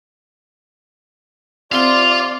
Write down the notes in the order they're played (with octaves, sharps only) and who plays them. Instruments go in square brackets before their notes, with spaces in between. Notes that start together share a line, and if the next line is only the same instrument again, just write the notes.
[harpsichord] C2 C3 F#5 [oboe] F4 [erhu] D5 [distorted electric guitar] F5 C6